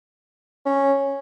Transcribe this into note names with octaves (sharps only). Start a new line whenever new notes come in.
C#4